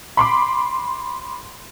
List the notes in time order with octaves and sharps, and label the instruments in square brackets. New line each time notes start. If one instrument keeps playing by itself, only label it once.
[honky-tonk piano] B5 C6 D6